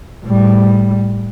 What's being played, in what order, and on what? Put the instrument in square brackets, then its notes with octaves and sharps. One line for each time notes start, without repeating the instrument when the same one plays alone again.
[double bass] A2 G3